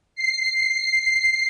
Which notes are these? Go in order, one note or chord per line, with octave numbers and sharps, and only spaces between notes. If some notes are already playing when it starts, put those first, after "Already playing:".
C7